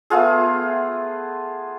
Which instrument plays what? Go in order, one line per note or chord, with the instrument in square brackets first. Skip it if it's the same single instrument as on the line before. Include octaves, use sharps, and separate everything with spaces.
[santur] A3 B3 F4 G#4